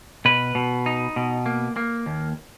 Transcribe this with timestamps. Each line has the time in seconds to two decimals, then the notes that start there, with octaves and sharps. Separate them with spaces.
0.25 B2 B4
0.55 B2
0.86 D#4
1.16 B2
1.46 A#3
1.76 A#3
2.06 D#2